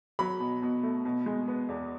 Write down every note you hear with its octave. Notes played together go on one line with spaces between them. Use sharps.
F#3 B5
B2
B2
A3
B2
G#3
B3
E2